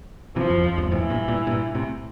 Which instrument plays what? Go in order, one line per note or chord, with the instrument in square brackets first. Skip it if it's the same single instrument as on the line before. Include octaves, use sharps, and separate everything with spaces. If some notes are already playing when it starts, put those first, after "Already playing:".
[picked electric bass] C3 E3 [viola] F3
[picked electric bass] F2
F2
E2 G2
[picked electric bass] F2 A2 [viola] E3
[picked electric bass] G2 A#2
G2 A#2
G2 A#2
A2 C3